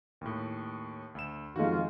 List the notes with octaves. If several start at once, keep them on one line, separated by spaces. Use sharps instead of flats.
D#2 A2
D2 E7
F2 D#3 G#3 F4 F#4